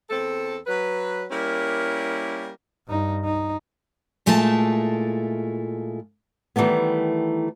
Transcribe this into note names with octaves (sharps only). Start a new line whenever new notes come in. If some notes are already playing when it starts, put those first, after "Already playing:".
E2 C4 A4
F#3 B4
G3 A#3 C#4 E4 A#4
G2 D#4
D#4
A#2 G#3 A3 E4 F4 A5
D#3 E3 G3 A3 B3